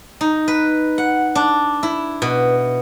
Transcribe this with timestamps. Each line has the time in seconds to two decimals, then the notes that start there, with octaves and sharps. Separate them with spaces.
0.21 D#4
0.48 B4
0.98 F#5
1.35 D4
1.83 E4
2.22 B2